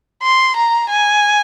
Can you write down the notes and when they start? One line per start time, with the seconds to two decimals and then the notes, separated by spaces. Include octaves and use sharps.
0.22 C6
0.56 A#5
0.89 G#5